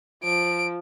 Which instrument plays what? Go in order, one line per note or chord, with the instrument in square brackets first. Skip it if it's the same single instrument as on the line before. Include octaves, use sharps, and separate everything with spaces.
[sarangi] F3 [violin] D7